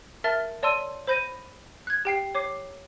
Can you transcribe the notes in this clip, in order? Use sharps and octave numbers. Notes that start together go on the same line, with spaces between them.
A#4 E5 A5 F6 A6
C#5 D5 A5 C6 E6 D#7
C5 B5 G6 A#6 D#7
F#6 G#6
G4 G5 C7
C#5 D6 C7